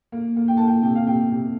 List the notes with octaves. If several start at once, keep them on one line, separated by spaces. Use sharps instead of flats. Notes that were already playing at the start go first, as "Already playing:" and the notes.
A#3
A#3
G5
A#3 A5
G5
C3 G5
F5
C3 G5
C3